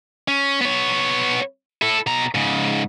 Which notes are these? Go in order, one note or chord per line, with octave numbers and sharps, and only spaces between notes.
C#4
B3 C#5
E4 A4
B2 A#5
G#2 C#3